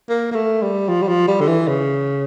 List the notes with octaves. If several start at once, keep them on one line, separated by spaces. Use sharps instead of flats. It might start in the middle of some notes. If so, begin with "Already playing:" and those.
A#3
A#3
A3
G3
F3
G3
F3
G3
D3
E3
C#3